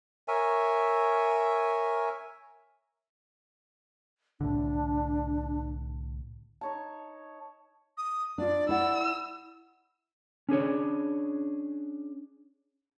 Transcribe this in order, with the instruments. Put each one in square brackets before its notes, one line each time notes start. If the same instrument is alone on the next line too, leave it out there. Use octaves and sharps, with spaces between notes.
[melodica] A#4 C#5 E5 G#5
[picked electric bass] C2 A2 D3 [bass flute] D4
[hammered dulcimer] D#4 C#5 A5
[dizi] D#6
[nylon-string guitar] D4 F4 [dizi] D5
[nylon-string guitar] E4 F#5 [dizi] D5 [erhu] E6
[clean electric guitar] C#4 D4 G#4 C#5